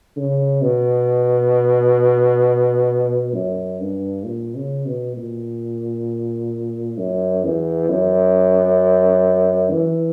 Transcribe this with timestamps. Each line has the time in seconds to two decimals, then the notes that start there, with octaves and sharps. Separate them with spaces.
0.17 C#3
0.62 B2
3.34 F#2
3.80 G2
4.25 A#2
4.56 C#3
4.86 B2
5.17 A#2
6.98 F#2
7.44 E2
7.89 F#2
9.71 E3